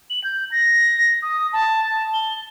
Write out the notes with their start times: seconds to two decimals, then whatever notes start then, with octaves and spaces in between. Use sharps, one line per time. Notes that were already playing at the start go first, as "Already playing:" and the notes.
0.10 F#7
0.24 G6
0.52 A#6
1.22 D#6
1.53 A5
2.14 G7